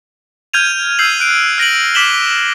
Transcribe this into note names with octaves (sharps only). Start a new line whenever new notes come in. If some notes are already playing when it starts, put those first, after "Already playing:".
F6 G6 G#6 D#7 F7
E6 G6 C7 D#7 F#7
F#6 D7
F6 A#6 D7 F#7
D6 B6 E7 F#7 G7